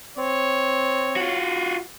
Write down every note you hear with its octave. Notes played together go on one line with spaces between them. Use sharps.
C4 C#5
F4 F#4